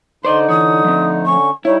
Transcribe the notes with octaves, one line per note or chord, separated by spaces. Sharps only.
D3 D#4 C5 D5 D#5 C6
E3 C#5 D#6
F3 A3 C4
D3 C#4 C#6
G3 D#4 E4 C#5